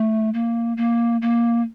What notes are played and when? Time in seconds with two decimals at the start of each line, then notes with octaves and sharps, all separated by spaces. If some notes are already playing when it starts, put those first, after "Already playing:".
Already playing: A3
0.34 A#3
0.77 A#3
1.22 A#3